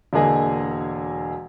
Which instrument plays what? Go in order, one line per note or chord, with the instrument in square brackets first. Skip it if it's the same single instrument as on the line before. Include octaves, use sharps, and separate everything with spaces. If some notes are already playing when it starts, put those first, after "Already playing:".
[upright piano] E1 D3 A#3 G#4 D#5 G#5